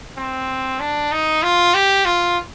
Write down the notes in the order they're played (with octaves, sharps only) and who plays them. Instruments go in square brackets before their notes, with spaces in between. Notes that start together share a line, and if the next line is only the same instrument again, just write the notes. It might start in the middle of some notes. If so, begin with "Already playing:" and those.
[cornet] C4
D4
D#4
F4
G4
F4